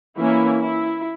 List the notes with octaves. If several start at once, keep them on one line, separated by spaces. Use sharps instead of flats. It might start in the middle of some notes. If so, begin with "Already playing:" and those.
E3 A#3 C#4 E4
E4